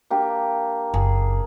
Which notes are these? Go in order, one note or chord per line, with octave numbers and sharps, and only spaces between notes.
A#3 D4 G4
F#1 G#4